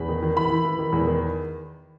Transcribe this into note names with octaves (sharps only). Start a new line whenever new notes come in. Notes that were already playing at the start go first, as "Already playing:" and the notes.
Already playing: E2 B5
D#3
D#3
E3 B5
E3
E3
D#3
E2
D#3